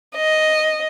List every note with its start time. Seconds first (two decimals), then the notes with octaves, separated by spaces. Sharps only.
0.16 D#5